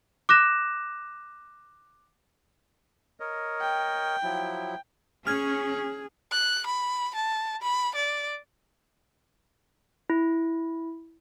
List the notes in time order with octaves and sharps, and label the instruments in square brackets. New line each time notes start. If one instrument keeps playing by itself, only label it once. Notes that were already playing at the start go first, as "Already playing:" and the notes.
[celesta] D6 F#6 A#6 E7
[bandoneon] A#4 C#5 D#5
[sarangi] G5
[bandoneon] F3 F#3 E4
[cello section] C#4 [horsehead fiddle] G#4 [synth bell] F6 G#6
[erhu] F#6
B5
A5
B5
D5
[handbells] E4